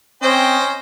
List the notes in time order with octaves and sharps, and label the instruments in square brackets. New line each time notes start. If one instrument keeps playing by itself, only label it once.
[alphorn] C4 [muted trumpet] C#4 [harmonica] C5 D#5 G5